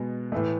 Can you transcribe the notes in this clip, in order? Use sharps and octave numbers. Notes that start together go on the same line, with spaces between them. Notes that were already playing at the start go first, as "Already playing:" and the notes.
Already playing: B2 G#3 B3
A2 E3 A3